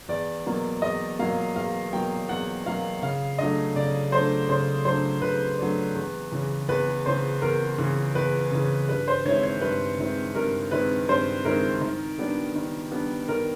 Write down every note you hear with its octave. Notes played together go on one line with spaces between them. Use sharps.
E2 D5
B2 F#3 A#3
E2 D#5
B2 F#3 A#3 F5
E2 F5
B2 F#3 A#3 G5
E2 F#5
B2 F#3 A#3 F5
C#3 F5
F#3 A3 D4 D#5
C#3 D5
F#3 A3 D4 C5
C#3 C5
F#3 A3 D4 C5
C#3 B4
F#3 A3 D4
E2
C#3 E3
E2 B4
C#3 E3 C5
E2 A#4
C#3 E3
E2 B4
C#3 E3
G2 B4
C5
D#3 G#3 C4 E4 C#5
C#5
G2 B4
D#3 G#3 C4 E4
G2 A#4
D#3 G#3 C4 E4 B4
G2 C5
D#3 G#3 C4 E4 A#4
D#3
G3 B3 D4
D#3
G3 B3 D4
D#3 A#4